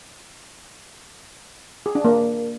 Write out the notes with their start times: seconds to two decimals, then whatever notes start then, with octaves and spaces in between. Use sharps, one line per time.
1.86 G#4
1.95 D4
2.05 A#3